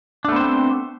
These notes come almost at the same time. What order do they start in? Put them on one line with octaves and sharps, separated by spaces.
D4 A3 B3 C5 C4